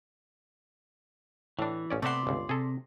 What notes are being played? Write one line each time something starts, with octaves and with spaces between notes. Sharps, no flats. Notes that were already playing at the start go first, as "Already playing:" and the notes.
A2 E3 D4
A1 C#4 D5
C3 A3 B3 C4 D5 E5 F#5 C6
G1 C#2
C3 G#4 A4